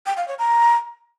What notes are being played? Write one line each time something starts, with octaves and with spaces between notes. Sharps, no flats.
G5
F5
C#5
A#5